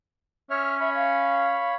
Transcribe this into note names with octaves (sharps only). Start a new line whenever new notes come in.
C#4 C#5 E5 F6
C#5 E5 B5
F5